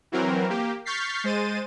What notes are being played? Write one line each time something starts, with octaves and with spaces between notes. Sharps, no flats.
E3 F#3 C4 A#4
A#3 G4
C#6 F6 G6 A6 B6 C7
G#3 C5 A6 D#7